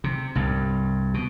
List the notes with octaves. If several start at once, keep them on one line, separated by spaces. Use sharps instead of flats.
C3
C2 G2
B2